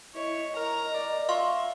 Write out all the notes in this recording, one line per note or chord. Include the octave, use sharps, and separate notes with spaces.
E4 C#5 D#5
A#4 D#5 A#5
D5
F4 E5 F5 C6 C#6